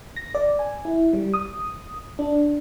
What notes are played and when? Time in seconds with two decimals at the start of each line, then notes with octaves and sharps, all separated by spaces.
0.16 A#6
0.35 D5
0.59 G#5
0.85 E4
1.13 G3
1.34 D#6
2.19 D4